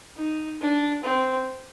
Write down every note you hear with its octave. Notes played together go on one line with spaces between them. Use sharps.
D#4
D4
C4